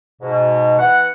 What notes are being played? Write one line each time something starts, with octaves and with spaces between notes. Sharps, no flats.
G#2 B2
E3 B3 F#5